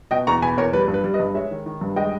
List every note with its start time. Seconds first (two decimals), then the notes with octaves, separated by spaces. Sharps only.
0.11 B2 D#5 G5
0.27 E2 A#5 C#6
0.42 B2 G#5 B5
0.57 E2 A#4 C#5
0.73 G3 B4
0.88 G2
0.94 B4
1.04 G3
1.14 B4 D#5
1.20 G2
1.34 G#3 C#5 E5
1.51 D#3
1.66 D#3
1.81 G2
1.96 G#3 D#5 G5